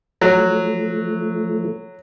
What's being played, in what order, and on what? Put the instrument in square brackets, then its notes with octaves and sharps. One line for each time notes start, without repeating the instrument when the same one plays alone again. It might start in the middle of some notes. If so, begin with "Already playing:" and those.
[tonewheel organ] F3 A3 [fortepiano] F#3